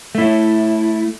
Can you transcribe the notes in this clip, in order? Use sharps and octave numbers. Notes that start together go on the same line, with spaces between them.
A3 E4